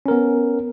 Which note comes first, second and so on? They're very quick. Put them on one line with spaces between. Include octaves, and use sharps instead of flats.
C#4 A#4 B3